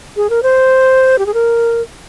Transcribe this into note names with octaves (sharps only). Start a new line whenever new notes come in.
G#4
A#4
C5
G4
G#4
A#4